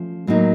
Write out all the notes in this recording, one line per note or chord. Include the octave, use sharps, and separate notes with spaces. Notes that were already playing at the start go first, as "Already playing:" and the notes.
Already playing: F3 A3 C#4
A2 F#3 A#3 D#4